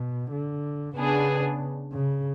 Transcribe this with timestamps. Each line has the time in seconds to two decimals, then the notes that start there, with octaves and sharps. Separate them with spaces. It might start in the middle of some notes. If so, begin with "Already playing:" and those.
Already playing: B2
0.32 D3
0.96 C#3 B3 D4 G#4
1.92 C#3